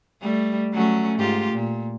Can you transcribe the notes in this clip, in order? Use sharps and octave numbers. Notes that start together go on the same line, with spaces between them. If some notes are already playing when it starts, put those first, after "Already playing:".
G3 A3
F#3 A3 C#4
G#2 F4 G4
A#2